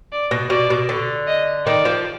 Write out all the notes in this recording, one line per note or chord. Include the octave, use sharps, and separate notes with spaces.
D5
B2
B2 D5
B2
D3
D#5
D#3 D5
F3